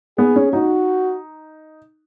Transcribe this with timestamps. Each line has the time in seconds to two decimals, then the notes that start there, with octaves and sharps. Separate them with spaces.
0.18 B3 G#4
0.36 C#4
0.53 D#4 F#4